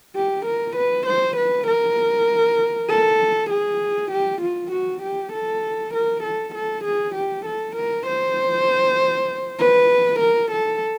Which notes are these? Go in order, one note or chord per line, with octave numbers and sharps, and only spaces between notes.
G4
A#4
B4
C5
B4
A#4
A4
G#4
G4
F4
F#4
G4
A4
A#4
A4
A4
G#4
G4
A4
A#4
C5
B4
A#4
A4